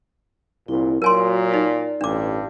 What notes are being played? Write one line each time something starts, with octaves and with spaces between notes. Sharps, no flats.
C2 A#2 E4
A#2 F#3 F#4 A#4 G#5 C6
D#4 D5
A1 G2 D4 D6